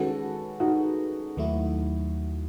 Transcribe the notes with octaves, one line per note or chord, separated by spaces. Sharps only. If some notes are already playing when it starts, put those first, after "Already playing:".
Already playing: D#3 G#3 C#4 F#4 G#4 A4 B4
D#4 F#4
D#2 D#3 F#3 A3 E4